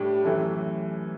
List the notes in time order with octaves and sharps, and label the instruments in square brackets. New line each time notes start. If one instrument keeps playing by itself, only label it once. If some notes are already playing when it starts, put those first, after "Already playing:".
Already playing: [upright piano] A2 G3 D4 [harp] G4
[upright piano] F#2 E3 A3